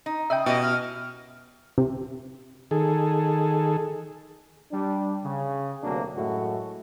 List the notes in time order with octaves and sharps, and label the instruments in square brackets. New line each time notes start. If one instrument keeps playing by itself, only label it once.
[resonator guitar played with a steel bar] D#4
[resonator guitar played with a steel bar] C#3 D#5 [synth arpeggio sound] E5 G5
[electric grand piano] B2 [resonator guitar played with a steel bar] C#4 E4 G4 [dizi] D#5
[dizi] F6
[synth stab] C3
[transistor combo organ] D#3 G#4 A4
[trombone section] G3 D4
C#3
D2 C3 F#3 A#3 D4
F#2 A2 G#3 A3 F#4